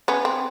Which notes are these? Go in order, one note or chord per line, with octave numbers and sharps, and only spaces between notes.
B3 C#4
C4